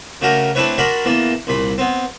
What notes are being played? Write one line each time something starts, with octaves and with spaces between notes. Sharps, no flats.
C#3 A3 F#4 G4 A#4
A3 C4 D4 E4 B4 C#5
D4 F#4 A#4 D5 B5 C6
E2 E3 A#3 A5
C2 A#2 B5
B3 C4